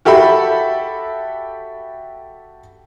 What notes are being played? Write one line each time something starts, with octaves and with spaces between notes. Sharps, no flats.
F#4 G4 A4 E5 B5